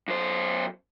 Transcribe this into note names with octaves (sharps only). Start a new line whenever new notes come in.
F#2 C5